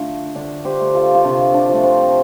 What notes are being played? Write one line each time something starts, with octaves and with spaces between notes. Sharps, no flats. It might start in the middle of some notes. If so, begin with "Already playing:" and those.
Already playing: D3 A3 F4 A4
D3 D4
G4 C5
A3
F4 A4
F4
C3 D4
D4
F3 A3
C4